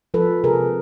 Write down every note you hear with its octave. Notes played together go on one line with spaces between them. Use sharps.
F3 A4 B4
C3 G#4 A#4